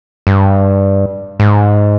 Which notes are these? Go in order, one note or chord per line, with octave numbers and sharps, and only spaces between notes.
G2
G#2